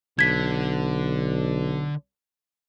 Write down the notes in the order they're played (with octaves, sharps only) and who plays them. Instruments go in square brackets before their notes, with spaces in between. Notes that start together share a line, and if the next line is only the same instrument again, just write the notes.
[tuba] B1 [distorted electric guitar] D3 [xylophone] G#6 B6